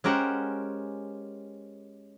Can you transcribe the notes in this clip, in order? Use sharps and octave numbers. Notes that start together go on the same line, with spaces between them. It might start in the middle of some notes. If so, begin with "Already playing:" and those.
G#3 C#4 G4 A#4 C5 F#5